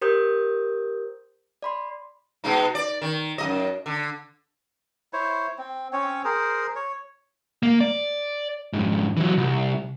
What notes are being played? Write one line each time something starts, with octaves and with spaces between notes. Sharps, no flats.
G4 A#4 C5 D#6 G6
D5 B5 C6
B2 G#3 D#4
D5
D#3
F#2 F#3 D#5
D3
E4 C5 C#5
C4
C4 C#4 C#5
G#4 A#4 C5
C#5
A#3
D5
F2 G#2
E3 F#3
C2